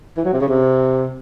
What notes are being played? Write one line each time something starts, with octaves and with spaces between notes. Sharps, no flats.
E3
F#3
C3
C#3
C3